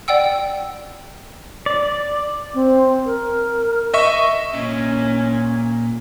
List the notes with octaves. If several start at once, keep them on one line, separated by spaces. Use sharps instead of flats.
D5 F#5 G5 E6
D5
C4
A#4
D#5 E5 C#6
A#2 C#4